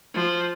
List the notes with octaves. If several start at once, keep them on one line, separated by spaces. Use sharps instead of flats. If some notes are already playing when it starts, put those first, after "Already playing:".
F3